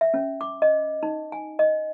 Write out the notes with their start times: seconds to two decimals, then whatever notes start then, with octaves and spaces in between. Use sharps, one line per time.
0.01 E5
0.14 C#4
0.41 D6
0.62 D#5
1.03 D#4
1.32 G#5
1.59 D#5